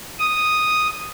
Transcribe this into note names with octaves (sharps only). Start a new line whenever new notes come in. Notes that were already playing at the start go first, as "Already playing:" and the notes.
D#6